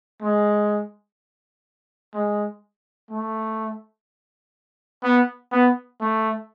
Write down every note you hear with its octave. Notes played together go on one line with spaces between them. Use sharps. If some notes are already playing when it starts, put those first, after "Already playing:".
G#3
G#3
A3
B3
B3
A3